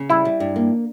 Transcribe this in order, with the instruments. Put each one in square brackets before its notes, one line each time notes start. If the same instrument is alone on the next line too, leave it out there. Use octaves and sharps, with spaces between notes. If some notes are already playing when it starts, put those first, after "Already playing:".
Already playing: [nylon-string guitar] C#3
[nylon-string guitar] G3 [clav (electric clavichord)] E4
[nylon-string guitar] G3
G2
A#3